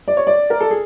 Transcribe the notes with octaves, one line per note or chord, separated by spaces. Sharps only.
D5
C#5
D5
A#4
A4
G#4